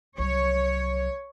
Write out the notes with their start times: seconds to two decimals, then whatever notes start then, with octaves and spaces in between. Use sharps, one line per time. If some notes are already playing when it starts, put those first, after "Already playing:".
0.18 C2 F#3 C#5